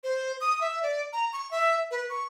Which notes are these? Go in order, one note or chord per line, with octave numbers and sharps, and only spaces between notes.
C5
D#6
E5
D5
A#5
C#6
E5
B4
C#6